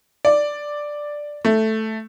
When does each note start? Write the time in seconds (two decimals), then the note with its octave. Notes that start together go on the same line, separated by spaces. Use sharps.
0.25 D5
1.45 A3